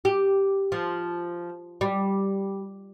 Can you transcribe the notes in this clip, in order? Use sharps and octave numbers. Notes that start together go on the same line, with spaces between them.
G4
F3
G3